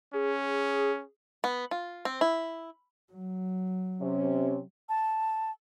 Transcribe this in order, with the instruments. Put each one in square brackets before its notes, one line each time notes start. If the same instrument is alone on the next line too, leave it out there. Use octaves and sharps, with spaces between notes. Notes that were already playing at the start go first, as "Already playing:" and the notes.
[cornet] C#4 [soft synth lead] G#4
[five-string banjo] B3
F4
C4
E4
[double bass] F#3
[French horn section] C3 C#4
[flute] A5